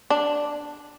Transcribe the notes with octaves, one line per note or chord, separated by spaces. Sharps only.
D4